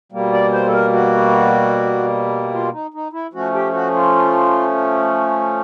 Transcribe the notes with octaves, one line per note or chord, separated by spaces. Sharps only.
B2 G3 A#3
D5
C5
A4
A#4
F#4
F4
D#4
D#4
E4
F3 A3 C#4 F#4
G4
F#4
F4